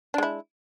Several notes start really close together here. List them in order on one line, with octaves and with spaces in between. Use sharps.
D4 G#3 E4